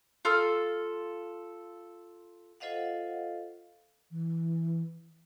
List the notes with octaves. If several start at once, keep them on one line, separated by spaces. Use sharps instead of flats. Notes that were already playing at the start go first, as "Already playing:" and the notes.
F4 A4 E6 F6
F4 A4 C5 D#5 F5 F#5
E3